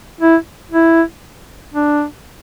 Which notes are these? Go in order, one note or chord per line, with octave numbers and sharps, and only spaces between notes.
E4
E4
D4